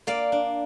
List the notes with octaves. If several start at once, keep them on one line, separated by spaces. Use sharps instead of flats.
A#3 D5 F5
D4